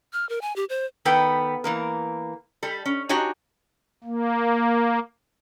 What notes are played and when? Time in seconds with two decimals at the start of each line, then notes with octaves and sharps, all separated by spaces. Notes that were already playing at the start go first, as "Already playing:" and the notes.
0.13 F6
0.29 A#4
0.41 G#5
0.56 G4
0.69 C5
1.05 D#3 B3 A4 B4 G5
1.64 E3 A#3 A#4
2.63 G3 A4
2.86 C#4
3.09 D4 D#4 F#4 G4 C#5 G#5
4.04 A#3